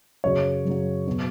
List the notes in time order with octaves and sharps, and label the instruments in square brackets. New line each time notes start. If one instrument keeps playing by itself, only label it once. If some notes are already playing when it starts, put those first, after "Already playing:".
[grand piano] F#2 C#3 F#3 C#5
F#2 C#3 F#3
B2 F#3